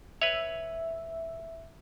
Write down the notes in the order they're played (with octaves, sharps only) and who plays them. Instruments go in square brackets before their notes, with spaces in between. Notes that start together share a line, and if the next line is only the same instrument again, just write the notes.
[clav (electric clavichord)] B4 C#5 [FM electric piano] E5